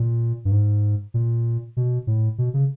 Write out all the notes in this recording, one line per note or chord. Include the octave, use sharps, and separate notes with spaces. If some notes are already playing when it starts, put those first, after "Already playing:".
Already playing: A#2
G2
G#2
A#2
B2
A2
B2
C#3